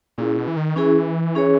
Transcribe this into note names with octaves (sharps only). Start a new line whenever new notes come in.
A#2 C#4 E4 G#4
B2
E3
D#3
E3 C#4 E4 G#4
C#4 G#4 C#5